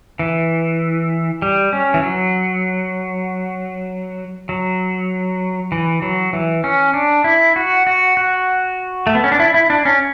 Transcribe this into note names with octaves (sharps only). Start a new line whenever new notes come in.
E3
G3
C#4
E3
F#3
F#3
E3
F#3
E3
C#4
D4
E4
F#4
F#4
F#4
A3
B3
C#4
D4
E4
E4
D4
C#4